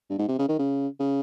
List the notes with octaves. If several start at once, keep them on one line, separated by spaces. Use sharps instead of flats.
G2
G#2
C3
C#3
D#3
C#3
C#3